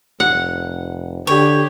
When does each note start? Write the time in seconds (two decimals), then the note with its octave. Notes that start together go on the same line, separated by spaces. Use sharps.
0.20 F1 F#5
1.27 D3 G4 C#5